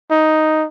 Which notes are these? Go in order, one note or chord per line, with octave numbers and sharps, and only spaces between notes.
D#4